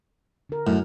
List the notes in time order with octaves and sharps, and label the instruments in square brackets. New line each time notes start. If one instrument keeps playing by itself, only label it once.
[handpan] D3 A#4
[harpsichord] F#2 [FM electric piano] A2